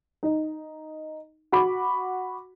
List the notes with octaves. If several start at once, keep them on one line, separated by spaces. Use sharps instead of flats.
D#4
F#4 B5 D6